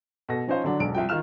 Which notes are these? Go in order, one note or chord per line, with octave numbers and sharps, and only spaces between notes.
B2 A4 A#6
F3 C#4 D#4 C5 F5
D3 F#3 D4
E1 B1 D7
C2 F3 G5
D#3 F4 F6 E7